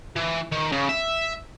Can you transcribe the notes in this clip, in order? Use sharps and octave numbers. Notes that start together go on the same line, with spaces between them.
E3
D#3
C#3
E5